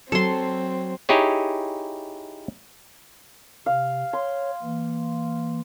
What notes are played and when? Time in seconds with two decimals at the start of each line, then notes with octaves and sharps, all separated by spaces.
0.12 F#3 C4 A4 C6
1.09 D#4 E4 G4 G#4 C#5
3.66 C3 F5
4.13 C#5 C6
4.62 E3 A#3